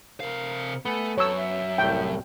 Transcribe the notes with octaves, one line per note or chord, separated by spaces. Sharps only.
C3 A#4 F5
A3 B3 G#5
F#2 A4 C#5 E6
E5
C2 A2 G5